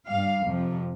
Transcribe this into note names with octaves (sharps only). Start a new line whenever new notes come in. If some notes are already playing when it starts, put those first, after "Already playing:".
G2 G3 F5
F2 C3 F3